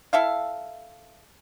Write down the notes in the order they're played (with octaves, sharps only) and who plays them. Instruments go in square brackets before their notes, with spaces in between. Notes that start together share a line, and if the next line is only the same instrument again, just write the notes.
[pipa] E4 A4 E5 F5